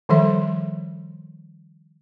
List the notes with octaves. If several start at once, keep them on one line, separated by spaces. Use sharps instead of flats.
D#3 F3 G3 A4 E5